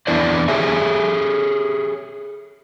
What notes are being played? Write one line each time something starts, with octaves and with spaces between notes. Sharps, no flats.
E2 B3 D4 E4 C5 D5
G4 G#4 C#5 E5 G#5